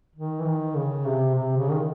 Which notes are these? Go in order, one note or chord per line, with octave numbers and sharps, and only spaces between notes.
D#3
E3
D#3
C#3
C3
C3
C#3
D#3